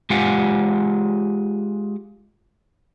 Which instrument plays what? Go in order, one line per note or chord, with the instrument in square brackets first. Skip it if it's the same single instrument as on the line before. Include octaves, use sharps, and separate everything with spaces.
[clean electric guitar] G#3 F4 G4 F5 F#5 G#5